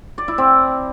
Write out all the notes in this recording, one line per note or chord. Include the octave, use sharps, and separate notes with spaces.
D5
E4
C4